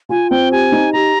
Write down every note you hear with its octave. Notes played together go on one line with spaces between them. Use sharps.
F4 G#5
C4 G5
G4 G#5
D#4
G4 A#5